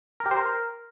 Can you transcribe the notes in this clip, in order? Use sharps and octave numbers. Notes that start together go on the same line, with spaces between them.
A#4
G4
C5
A#4